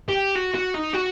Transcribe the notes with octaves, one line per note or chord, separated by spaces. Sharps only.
G4
F#4
F#4
D#4
F#4